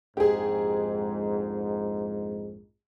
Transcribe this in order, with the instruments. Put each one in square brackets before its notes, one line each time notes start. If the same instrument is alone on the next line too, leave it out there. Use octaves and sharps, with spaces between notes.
[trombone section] A#1 F2 G#2 [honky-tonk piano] G4 G#4